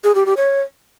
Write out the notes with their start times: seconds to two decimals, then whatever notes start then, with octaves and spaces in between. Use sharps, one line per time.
0.04 G#4
0.15 G4
0.26 G4
0.37 C#5